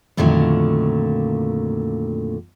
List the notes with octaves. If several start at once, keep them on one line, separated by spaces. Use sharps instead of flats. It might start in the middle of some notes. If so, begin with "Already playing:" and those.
F2 A#2 D3 D#3 F#3 A3